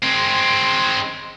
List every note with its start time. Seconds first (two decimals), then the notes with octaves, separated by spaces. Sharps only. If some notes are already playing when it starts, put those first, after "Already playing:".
0.03 G#3 C4